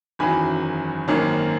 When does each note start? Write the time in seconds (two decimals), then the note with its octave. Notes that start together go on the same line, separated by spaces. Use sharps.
0.19 F#1 E2 D#3 F#3 C#4 G#5 B5
1.08 G#1 F#2 D#3 A#3 C#4